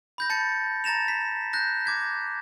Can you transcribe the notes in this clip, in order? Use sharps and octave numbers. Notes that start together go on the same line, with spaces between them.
B5 G6 A#6
A5 G6 A6 C#7
A#5 A6 A#6 E7 F7
B6
F#6 G6 A#6
D6 G#6 B6